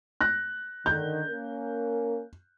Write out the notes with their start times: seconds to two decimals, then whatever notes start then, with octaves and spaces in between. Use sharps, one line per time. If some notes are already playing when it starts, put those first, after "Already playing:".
0.21 F#6 A#6
0.86 D3 D#3 G6
1.28 A#3 C#4 A#4